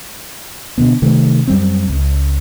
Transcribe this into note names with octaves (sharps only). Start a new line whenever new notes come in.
B2 D3 B3
C3 D#3 A3
F#2 G3 C4
C#2